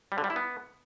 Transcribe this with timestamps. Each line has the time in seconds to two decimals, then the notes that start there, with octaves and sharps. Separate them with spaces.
0.12 G3
0.18 D3
0.24 G3
0.30 E4
0.36 B3